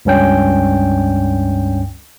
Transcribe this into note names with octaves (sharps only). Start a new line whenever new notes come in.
C#2 G2 C#4 G5